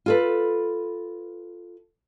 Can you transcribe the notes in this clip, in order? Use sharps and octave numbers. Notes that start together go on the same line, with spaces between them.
F4 A4 B4